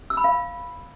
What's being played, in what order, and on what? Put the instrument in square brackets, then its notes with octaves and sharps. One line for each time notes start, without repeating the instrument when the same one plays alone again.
[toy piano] E6
B5
F5